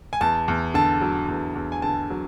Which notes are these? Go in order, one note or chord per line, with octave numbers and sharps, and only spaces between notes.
G#5
E2 A5
E2
D3 A5
F#3
E2
E2
G#5
D3 A5
F#3